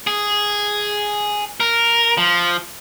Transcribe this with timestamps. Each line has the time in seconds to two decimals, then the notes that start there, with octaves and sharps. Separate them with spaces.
0.07 G#4
1.60 A#4
2.17 F3